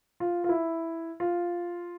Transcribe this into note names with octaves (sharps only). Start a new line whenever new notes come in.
F4
F4
E4
F4